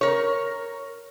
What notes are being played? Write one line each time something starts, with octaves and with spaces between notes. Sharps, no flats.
A#4 C#5